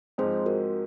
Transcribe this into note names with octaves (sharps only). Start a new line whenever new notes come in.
G#2 F3 G#3 C4 D#4 G#4 C5
F#4 A#4